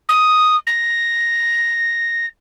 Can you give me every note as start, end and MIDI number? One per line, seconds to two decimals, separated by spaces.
0.09 0.56 87
0.67 2.26 94